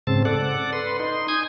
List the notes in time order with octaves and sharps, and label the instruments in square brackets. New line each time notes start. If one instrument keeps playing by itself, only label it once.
[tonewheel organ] G#2 C#3 C4 A5
A4 D5 F#5
B4 C6
D#4 C6
G#5 D#6 G6 G#6